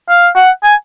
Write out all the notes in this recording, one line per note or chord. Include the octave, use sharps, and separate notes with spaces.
F5
F#5
G#5